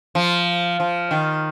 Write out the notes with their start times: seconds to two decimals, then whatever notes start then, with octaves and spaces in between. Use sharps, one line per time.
0.15 F3
0.80 F3
1.11 D#3